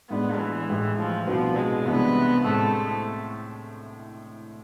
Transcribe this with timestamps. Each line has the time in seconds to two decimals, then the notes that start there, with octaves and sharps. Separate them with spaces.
0.10 A2 G#3 B3 D4
0.38 E3
0.69 A1 A2 G#3
0.98 F3
1.27 C2 B2 F3 B3 D4
1.57 G#3
1.86 C2 C3 E3 G#3 B3 D4
2.45 A2 G#3 A3 C4